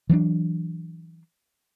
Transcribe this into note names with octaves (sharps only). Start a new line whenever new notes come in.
E3 F#3 A3 D4